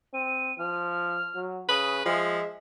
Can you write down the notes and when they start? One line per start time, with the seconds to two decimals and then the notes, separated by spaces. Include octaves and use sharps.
0.13 C4 D#7
0.58 F3 F6
1.35 F#3
1.69 C#3 B4 D#6
2.06 F3 G#3 E5